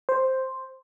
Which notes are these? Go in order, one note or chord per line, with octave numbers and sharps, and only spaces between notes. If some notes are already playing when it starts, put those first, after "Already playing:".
C5